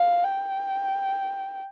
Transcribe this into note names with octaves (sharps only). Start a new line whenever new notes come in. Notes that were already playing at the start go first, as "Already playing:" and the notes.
Already playing: F5
G5